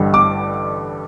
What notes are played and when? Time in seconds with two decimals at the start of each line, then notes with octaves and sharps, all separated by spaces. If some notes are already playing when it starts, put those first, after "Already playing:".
Already playing: A1 G2 D3 G3
0.14 D6